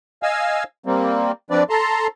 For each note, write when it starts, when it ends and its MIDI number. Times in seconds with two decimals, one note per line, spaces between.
0.23 0.64 75
0.23 0.64 77
0.23 0.64 80
0.23 0.64 88
0.86 1.32 55
0.86 1.32 58
0.86 1.32 60
1.50 1.63 53
1.50 1.63 60
1.50 1.63 62
1.50 1.63 71
1.50 1.63 74
1.70 2.07 69
1.70 2.07 81
1.70 2.07 82
1.70 2.07 84